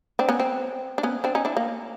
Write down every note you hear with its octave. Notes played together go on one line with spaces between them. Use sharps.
C4 D4
B3 C#4
C4
D4
B3 C#4
C4 D4
C#4 D#4
D4 E4
A#3